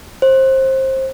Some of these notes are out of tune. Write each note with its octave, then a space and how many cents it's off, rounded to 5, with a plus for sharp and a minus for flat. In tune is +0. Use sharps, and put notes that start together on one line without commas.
C5 +25